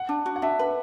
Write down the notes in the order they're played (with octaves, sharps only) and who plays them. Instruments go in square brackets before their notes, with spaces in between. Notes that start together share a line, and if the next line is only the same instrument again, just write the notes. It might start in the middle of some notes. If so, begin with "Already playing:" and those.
Already playing: [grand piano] F#5
[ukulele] D4
F#4
[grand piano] F#5
[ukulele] D4 [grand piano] E5
[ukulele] B4